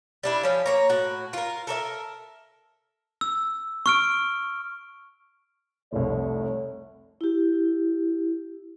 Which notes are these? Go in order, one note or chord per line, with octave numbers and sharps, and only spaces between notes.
G3 D4 E4
F3 C#4 F5
A#3 C#5 A#5
A2 F#4
F4 A#4
A4 A#4 D5 E5
E6
C#6 F6 D7
F1 C2 A3 C#5
E4 G4